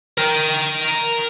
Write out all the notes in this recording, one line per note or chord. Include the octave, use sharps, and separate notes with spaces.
A#4 G5